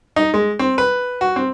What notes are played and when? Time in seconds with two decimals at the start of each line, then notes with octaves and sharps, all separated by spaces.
0.16 D#4
0.34 G#3
0.59 C4
0.78 B4
1.21 F#4
1.36 C4